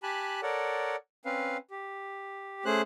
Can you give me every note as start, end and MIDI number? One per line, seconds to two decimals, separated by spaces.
0.03 0.41 67
0.03 0.41 80
0.03 0.41 81
0.03 0.41 83
0.03 0.41 90
0.42 0.96 69
0.42 0.96 70
0.42 0.96 73
0.42 0.96 74
0.42 0.96 78
1.25 1.57 60
1.25 1.57 61
1.25 1.57 71
1.25 1.57 77
1.71 2.64 67
2.65 2.82 57
2.65 2.82 61
2.65 2.82 68
2.65 2.82 72
2.65 2.82 90